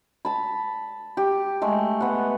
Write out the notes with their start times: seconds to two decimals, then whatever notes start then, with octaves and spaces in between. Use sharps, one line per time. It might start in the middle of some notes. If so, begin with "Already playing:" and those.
0.25 A5 B5
1.17 G4
1.62 G#3 A3
2.01 B3 F#5